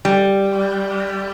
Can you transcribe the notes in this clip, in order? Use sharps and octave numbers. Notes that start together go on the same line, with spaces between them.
G3